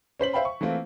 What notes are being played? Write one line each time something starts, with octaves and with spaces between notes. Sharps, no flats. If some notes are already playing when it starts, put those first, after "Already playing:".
C#4 C5 B6 F#7
C5 E5 F5 G5 B5
C#6
E3 A3 A#3 C4 F4